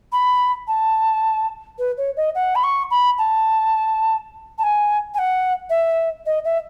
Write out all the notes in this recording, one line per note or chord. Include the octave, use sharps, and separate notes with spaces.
B5
A5
B4
C#5
D#5
F#5
B5
C#6
B5
A5
A5
G#5
G#5
F#5
E5
D#5
E5